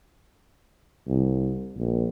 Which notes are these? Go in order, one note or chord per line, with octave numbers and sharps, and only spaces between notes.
C2
A#1